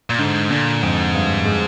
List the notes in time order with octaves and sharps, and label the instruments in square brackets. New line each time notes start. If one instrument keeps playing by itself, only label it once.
[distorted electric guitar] A#2
[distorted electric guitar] G#2 [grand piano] D3
[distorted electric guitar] A#2 [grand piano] D3
[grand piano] F2 [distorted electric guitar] G#2
[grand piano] G2
G#3